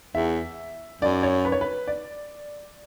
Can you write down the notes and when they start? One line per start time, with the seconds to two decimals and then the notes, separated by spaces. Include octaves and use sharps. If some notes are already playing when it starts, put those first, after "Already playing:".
0.15 E2 E5
1.01 F#2 D5
1.23 C#5
1.45 B4
1.52 C#5
1.61 B4
1.87 D5